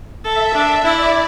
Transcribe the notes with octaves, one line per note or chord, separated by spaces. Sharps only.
A4 E5
D4
E4 D5